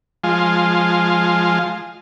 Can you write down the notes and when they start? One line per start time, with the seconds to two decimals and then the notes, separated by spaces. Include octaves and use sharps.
0.24 F3 G#3 F4